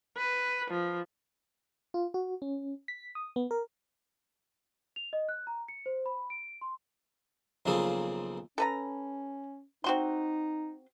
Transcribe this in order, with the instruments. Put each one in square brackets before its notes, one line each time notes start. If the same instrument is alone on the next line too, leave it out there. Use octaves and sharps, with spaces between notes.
[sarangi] B4
F3
[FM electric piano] F4
F#4
C#4
B6
D#6
B3
A#4
[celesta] F7
D#5
F#6
A#5
C#7
C5
B5
D7
C6
[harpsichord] B1 C#3 F3 A#3 G#4 A4
[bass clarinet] C#4 [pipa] A4 B4 A#5
[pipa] C4 F#4 C6 [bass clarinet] D#4